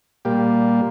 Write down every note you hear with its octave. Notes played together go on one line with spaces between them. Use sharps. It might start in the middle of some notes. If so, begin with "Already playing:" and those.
A#2 G3 A#3 G4